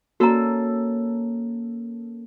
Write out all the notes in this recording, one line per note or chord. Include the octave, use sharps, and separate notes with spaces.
A#3 C#4 F#4 A4 A#5